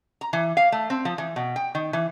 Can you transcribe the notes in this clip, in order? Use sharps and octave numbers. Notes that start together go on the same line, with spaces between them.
A#5
E3
F5
A3
C4
F3
E3
B2
G5
D#3
E3